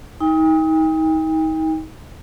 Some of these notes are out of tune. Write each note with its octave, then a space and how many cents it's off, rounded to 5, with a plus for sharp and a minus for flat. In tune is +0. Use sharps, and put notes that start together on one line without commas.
D#4 +30 G5 +40